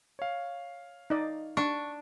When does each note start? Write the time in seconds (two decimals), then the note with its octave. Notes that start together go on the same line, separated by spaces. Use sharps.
0.19 C#5 F5
1.10 D#4 D5 D#5
1.57 D4 C#6